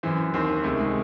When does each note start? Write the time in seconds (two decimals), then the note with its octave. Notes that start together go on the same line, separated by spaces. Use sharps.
0.03 F#2 E3 C4
0.34 D#2 D#3 C4
0.64 C#2 C3 D#3 A3
0.79 G#3